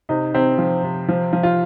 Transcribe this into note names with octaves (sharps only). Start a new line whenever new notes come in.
C3 D#4
C3 C4
F3
C3
F3
F3
F4